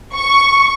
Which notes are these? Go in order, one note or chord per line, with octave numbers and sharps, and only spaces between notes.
C#6